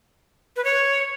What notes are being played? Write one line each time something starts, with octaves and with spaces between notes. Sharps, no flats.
B4
C#5